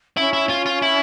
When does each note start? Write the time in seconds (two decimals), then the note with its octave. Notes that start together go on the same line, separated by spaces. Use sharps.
0.17 C#4 E4
0.33 E4
0.49 F4
0.66 F4
0.82 E4